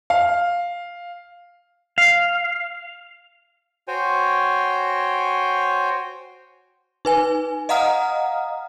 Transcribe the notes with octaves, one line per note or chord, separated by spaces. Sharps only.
F5
F5
F#4 C5 C#5 G5 G#5
D#4 B4 G#5
D#5 F5 F#5 A#5 D#6 F6